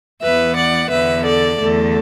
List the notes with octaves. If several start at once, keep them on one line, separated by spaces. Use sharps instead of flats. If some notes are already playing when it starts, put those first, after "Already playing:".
E2 E3 B3 B4 E5
D5 F#5
E2 D3 B3 B4 E5
A4 D5
E2 D3 A3 A4